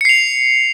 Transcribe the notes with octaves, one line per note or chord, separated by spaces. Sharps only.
C7 C#7 F7